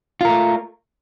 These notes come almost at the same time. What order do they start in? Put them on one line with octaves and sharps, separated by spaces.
F4 A#4 A3